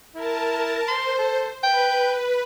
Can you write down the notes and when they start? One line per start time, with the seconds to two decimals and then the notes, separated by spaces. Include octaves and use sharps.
0.15 E4 A#4 A5
0.88 C5 C6
1.18 A4
1.63 B4 G5